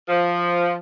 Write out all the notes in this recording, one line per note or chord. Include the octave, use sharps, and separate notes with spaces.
F3